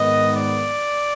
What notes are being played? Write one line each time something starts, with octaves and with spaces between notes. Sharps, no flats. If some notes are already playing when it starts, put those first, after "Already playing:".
Already playing: G#2 D#3 B3 D#5
D5